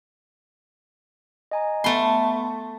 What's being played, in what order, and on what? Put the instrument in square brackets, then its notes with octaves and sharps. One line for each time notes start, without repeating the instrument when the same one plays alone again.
[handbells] D#5 G#5 A#5
[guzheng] A3 C6 [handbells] B3 A5 B5